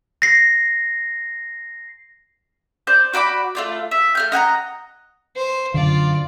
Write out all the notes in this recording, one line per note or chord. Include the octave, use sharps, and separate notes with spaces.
A#6 C7
C5 D5 G6
F#4 D5 B5 D6
A3 F4 D5
E5
A3 F6 G6
D#5 F#5 G#5 A#5
C5
F#2 D3 F4 D5